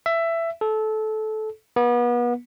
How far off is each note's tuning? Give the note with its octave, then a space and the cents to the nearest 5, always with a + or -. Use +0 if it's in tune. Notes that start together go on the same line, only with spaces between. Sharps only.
E5 +15
A4 -20
B3 -35